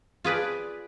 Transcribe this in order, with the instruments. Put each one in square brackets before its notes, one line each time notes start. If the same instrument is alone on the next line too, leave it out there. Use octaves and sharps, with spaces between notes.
[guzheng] F4 G#4 B4 D5